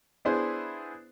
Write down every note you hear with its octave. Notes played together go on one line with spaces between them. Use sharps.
B3 D4 E4 G#4 C5